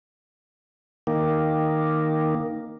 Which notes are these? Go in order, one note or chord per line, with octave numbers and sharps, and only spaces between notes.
D#3 A#3